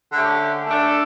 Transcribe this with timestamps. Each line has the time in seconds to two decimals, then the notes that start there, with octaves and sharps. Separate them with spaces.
0.12 D3 A3 C#4 G4
0.66 A3 D4 A4